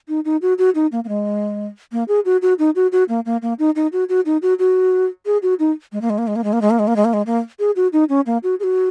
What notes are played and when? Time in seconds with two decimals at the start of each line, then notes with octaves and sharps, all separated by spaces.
0.08 D#4
0.25 D#4
0.42 F#4
0.58 F#4
0.75 D#4
0.92 A#3
1.04 A#3
1.08 G#3
1.92 A#3
2.08 G#4
2.25 F#4
2.42 F#4
2.59 D#4
2.76 F#4
2.92 F#4
3.09 A#3
3.26 A#3
3.42 A#3
3.59 D#4
3.76 D#4
3.93 F#4
4.09 F#4
4.26 D#4
4.42 F#4
4.59 F#4
5.26 G#4
5.42 F#4
5.59 D#4
5.92 G#3
6.01 A#3
6.10 G#3
6.18 A#3
6.27 G#3
6.36 A#3
6.44 G#3
6.53 A#3
6.62 G#3
6.70 A#3
6.79 G#3
6.87 A#3
6.96 G#3
7.05 A#3
7.13 G#3
7.26 A#3
7.59 G#4
7.76 F#4
7.93 D#4
8.09 C#4
8.26 A#3
8.43 F#4
8.60 G#4
8.63 F#4